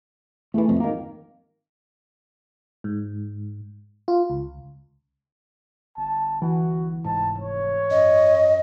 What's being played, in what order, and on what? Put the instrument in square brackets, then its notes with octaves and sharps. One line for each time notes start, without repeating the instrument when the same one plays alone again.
[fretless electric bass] E2 E3 [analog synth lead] A3
[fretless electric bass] C2 F2
[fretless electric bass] G#1 D#3 [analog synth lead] A#3
[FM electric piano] G#2
F4
C#2
[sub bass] G1 [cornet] A5
[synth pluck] E3 [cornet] F#4
[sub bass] F1 [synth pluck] G#2 [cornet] A5
[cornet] C#5
[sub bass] F#2 [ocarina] D#5